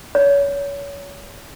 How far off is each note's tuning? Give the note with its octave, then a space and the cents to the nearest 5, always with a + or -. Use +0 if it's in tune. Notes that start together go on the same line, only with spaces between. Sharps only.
C#5 +30